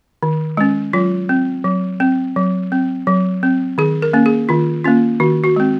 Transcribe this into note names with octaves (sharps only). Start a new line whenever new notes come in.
D#3
G#3 C#4
F#3 F4
C4
F#3
C4
F#3
C4
F#3
C4
D#3 G#4
A#4
A#3 C#4
G#4
D#3 F4
A#3 C#4 F4
D#3 F#4
F#4
G#3 C4